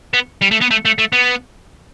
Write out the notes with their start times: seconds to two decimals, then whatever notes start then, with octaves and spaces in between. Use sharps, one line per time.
0.14 B3
0.42 G3
0.51 A3
0.61 B3
0.71 A3
0.85 A3
0.98 A3
1.12 B3